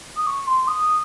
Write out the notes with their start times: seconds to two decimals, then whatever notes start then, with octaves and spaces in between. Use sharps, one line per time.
0.17 D#6
0.27 C#6
0.47 C6
0.67 D#6